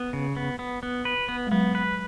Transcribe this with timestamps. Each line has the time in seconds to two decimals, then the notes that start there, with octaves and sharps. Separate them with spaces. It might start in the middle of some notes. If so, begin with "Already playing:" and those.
Already playing: B3
0.13 C#3
0.37 B3
0.59 B3
0.83 B3
1.05 B4
1.29 B3
1.47 G#3
1.52 F#3 B3
1.75 B4